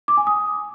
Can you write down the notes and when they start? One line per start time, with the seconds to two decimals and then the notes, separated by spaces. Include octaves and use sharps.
0.08 D6
0.17 G#5
0.27 D#6